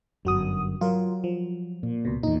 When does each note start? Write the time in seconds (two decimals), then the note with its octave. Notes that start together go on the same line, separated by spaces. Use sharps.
0.25 G1 F#2 F#3 F#4 D#6
0.81 F#3 F4 A#4
1.24 F3
1.83 A#2
2.05 C#2 B2
2.23 E2 A#2 D#4